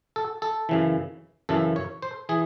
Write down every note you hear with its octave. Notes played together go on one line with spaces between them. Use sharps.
A4
A4
F#2 C#3 E3
F#2 C#3 E3 A4
C#5
C5
E3 G#4